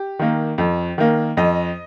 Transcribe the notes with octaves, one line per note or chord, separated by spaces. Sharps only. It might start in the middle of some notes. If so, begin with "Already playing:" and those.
Already playing: G4
D#3 A#3
F2
D#3 A#3
F2 D#5